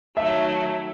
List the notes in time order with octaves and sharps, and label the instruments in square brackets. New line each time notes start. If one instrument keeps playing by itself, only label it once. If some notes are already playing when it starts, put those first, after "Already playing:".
[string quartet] D#3 F#3 A3 [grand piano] E5